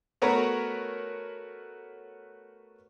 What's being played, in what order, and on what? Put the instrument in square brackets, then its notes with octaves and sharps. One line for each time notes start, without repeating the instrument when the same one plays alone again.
[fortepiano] A3 B3 F#4 A#4 B4 C#5